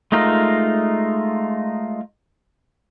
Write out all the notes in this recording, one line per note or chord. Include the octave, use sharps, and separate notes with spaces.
G#3 A3 D#4 F4 A#4